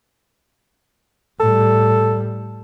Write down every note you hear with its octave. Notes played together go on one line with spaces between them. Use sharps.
A2 G3 A4